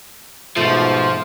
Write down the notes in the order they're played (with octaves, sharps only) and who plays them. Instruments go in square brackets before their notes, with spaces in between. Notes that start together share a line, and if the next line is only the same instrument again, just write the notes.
[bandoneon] G#2 B2 [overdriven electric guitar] F3 [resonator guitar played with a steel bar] A3 [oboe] C5